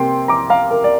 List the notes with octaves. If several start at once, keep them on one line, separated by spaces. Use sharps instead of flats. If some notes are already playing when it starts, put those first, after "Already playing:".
Already playing: C3 A#3 G5 C6
A#5 D6
F5 A#5
A#4
D5